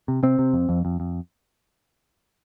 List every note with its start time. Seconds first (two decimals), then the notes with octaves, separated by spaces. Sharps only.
0.08 C3
0.23 C3 C4
0.39 C3
0.53 F2
0.69 F2
0.85 F2
1.00 F2